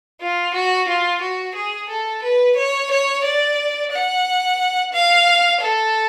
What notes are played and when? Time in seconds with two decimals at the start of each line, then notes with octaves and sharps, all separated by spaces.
0.21 F4
0.54 F#4
0.88 F4
1.21 F#4
1.55 G#4
1.89 A4
2.23 B4
2.56 C#5
2.91 C#5
3.24 D5
3.92 F#5
4.93 F5
5.61 A4